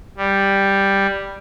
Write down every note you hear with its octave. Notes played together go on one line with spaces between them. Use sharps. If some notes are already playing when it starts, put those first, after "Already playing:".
G3